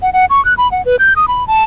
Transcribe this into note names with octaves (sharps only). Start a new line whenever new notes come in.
F#5
F#5
C#6
F#6
B5
F#5
B4
G6
D#6
B5
A5